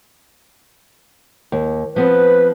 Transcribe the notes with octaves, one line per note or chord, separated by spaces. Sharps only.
D#2
F3 B3 C4 B4